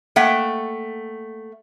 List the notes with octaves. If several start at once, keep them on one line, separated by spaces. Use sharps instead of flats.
A3 A#3 E5 F#5 G5